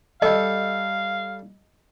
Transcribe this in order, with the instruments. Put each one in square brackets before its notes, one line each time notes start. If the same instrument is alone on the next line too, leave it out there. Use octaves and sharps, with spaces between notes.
[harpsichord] G3 A4 [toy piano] D#5 [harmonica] F5